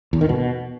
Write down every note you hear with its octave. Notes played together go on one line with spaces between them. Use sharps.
E2
D#3
B2